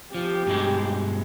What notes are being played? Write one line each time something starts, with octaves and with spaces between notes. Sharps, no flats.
F3 G4
G2 B2 G#3